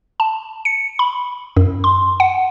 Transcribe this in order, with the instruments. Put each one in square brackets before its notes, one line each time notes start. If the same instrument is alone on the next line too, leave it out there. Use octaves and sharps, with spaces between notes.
[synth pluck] A5
C#7
B5
F#2
C6
F#5